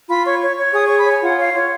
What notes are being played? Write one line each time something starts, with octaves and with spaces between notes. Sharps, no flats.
F4 B5
C#5 C#6
C#5
C#5
G#4 D#6
C#5 C#6
B5
C#5 G#5
F4 F#5
C#5 F5
F4 C#5